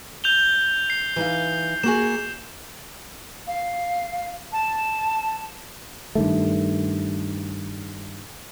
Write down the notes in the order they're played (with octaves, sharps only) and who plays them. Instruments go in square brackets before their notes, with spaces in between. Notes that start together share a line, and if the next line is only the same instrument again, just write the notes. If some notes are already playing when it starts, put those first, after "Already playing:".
[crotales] G6 F7 G7
C7
[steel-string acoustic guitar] E3 D#4 F5
[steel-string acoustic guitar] A#3 F#4 G#4 [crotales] E7
[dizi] F5
A5
[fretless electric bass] G2 D#3 A3